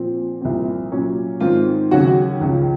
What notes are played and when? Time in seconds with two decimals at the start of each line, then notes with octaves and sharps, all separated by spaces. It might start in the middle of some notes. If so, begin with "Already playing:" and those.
Already playing: A#2 F3 C4
0.41 C2 A#2 F3 C4
0.91 A#2 F#3 C#4
1.40 G#2 D#3 G#3 C4 F4
1.91 D#2 C#3 F#3 C#4 F#4
2.41 C#2 C#3 F3